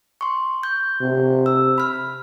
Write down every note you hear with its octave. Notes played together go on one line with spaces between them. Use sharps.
C6 C#6
G6
C3
E6
B5 F6